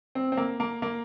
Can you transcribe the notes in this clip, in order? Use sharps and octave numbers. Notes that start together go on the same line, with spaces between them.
C4
C4
A#3
A#3
A#3